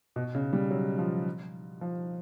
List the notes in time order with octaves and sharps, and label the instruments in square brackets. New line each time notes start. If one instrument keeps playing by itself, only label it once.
[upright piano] B2
C#3
G3
F#3
F3
F3